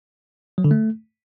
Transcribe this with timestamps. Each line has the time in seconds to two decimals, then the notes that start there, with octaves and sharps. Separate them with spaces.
0.58 F#3
0.64 D3
0.71 A3